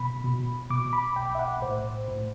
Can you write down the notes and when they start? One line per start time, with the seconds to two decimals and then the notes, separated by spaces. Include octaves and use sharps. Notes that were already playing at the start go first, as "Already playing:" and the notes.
Already playing: B2 B5
0.24 B2
0.70 B2 D6
0.93 B5
1.16 B1 G5
1.35 E5
1.39 F#5
1.62 A2 C5
2.08 A2